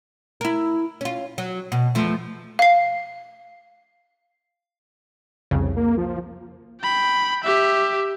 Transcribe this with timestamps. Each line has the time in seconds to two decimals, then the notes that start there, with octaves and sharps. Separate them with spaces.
0.41 E4 A#4
1.01 C#4 F4
1.38 F#3
1.72 B2
1.95 E2 F3 A3
2.59 F5 C7
5.51 C2 F2 C#3
5.76 A#3
5.98 F3
6.82 G5 B5
7.44 G4 E5